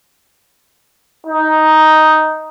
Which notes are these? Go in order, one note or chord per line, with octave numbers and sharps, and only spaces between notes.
D#4